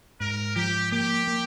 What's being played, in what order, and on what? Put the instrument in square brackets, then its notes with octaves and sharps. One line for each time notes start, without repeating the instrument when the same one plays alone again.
[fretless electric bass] G#2 [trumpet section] A#4
[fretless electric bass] F3 [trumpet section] G4
[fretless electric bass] A#3 [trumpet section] G4
[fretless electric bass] A#3